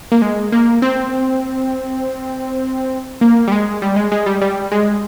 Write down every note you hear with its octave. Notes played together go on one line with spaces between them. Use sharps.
A#3
G#3
A#3
C4
A#3
G3
G#3
G3
G#3
G#3
G3
G3
G#3